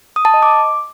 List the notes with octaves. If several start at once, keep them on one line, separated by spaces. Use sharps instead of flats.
D#6
A5
D#5
D6